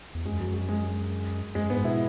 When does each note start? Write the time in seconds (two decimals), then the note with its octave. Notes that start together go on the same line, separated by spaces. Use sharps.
0.15 E2
0.25 F#2 G#3
0.40 F#3
0.54 G#3
0.69 G#3
1.55 F#2 G#3
1.70 G#2 B3
1.84 B2 E4